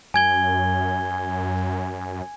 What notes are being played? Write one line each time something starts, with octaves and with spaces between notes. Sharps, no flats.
F#2 G#5 G#6 G7